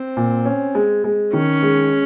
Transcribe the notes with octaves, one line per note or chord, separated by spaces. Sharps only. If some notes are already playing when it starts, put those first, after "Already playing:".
Already playing: C4
A#2
C#4
G#3
G#3
D#3 C#4
G#3